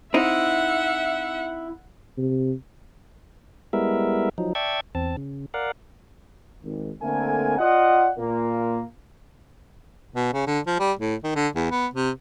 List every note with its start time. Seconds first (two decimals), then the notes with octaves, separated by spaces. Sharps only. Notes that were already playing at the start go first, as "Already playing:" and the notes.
0.14 C4 D#4 E4 E5 F#5
2.18 C3
3.73 G3 G#3 B3 E4 A#4 E5
4.38 F3 F#3 D#4
4.55 D5 E5 G5 A5 C#6 G#6
4.95 E2 C4 A5
5.17 C#3
5.54 A#4 D5 F5 F#5
6.64 G#1
7.02 D3 A3 A#3 C4 A#4 G#5
7.58 F4 D5 D#5 F#5
8.18 A#2 A#3
10.14 B2
10.34 C#3
10.47 D3
10.67 F3
10.80 G3
11.00 A2
11.24 D#3
11.36 D3
11.55 E2
11.70 B3
11.94 C3